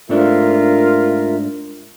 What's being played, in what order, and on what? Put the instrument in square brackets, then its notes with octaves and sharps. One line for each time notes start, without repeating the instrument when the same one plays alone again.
[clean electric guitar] G#2 A3 D4 [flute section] F4 A#4 E5